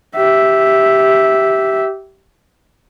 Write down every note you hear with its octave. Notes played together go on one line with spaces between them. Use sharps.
G4 E5